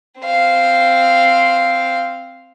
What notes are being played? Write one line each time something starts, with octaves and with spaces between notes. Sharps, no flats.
C4 F5